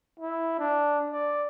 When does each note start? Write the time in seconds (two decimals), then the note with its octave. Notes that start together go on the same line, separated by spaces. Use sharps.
0.20 E4
0.59 D4
1.10 D5